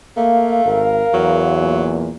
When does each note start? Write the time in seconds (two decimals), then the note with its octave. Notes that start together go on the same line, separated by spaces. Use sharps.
0.17 A3 A#3 F5
0.65 G#1 A#4
1.14 E2 F#3
1.60 A#2